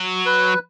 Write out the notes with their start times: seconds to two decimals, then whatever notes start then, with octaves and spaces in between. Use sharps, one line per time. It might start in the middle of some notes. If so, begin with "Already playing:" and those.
Already playing: F#3
0.26 B4